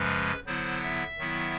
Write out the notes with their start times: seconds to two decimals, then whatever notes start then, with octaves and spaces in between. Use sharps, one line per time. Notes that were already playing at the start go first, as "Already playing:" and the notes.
Already playing: F#2 C#3 F3 G#3 B4
0.46 D3 F#3 B3 E4 C5
0.83 E5
1.18 D#3 F#3 B3 E4